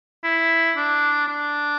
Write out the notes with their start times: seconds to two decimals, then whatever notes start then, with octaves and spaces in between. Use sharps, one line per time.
0.24 E4
0.77 D4
1.28 D4